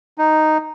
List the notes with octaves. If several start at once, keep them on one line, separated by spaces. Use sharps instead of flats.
D#4